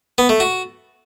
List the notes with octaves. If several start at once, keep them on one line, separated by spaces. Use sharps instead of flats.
B3
A3
F#4